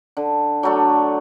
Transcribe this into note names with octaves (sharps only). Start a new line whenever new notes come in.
D3
F#3 A3 D4